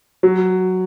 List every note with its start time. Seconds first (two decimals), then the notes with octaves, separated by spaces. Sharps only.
0.23 F#3